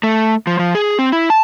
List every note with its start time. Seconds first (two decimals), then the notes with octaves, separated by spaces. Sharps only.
0.03 A3
0.47 F3
0.59 F3
0.75 G#4
0.99 C4
1.12 E4
1.30 A5